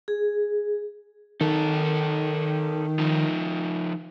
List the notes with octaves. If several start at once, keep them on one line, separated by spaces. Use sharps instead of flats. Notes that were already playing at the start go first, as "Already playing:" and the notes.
G#4
D#3 D#4 A4
F3 D#4